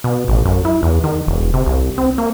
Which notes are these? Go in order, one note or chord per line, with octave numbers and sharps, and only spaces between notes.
B2
A1
F#2
E4
E2
D#3
E1
C3
C2
C4
A#3